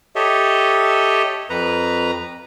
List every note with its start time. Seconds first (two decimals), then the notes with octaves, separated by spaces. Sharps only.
0.15 G4 A4 C#5 D#5 E5
1.50 F2 B4 A#5